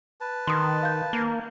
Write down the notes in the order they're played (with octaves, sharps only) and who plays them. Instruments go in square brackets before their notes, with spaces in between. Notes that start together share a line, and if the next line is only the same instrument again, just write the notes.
[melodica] B4 A5
[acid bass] D#3 [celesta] C6 D#6
[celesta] F5 G6
[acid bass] A#3